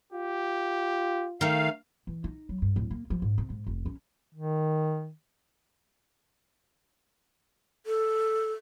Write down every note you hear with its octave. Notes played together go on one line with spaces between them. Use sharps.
F4 G4
D#3 A3 F5
E3
D#4
F#3
G2
D1
A#3
F3
G#2
C3
G#2
F1
C#4
D#3
A4